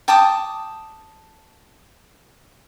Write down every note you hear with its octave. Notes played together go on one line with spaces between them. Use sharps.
G5 A5 D6 D#6